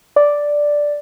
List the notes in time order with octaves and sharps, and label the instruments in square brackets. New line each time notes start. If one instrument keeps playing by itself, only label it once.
[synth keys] D5